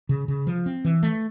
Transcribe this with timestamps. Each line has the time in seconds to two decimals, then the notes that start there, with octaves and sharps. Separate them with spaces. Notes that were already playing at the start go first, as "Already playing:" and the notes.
0.09 C#3
0.28 C#3
0.47 F3
0.66 C4
0.85 E3
1.03 A3